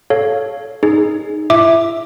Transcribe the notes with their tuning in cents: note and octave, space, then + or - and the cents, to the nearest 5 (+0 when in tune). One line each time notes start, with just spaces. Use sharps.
A4 -15 C#5 +0 F5 +0
D#4 +0 G#4 +0
E4 +35 E5 +0 D6 +10